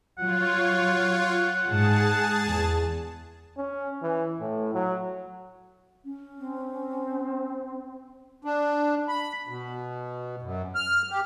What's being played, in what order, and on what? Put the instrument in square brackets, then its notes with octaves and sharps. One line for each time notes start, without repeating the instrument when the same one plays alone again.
[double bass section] F#3 [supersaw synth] F4 C#5 [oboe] F#5
[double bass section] G#2 [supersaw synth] G#4 A5
[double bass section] E2
[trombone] C#4
E3
A2
F#3
[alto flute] C#4
[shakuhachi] C4
[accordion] D4
B5
B2
F#2
F6
G4